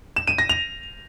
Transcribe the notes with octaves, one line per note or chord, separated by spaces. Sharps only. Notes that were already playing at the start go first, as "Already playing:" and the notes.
E7
D#7
A#6
F7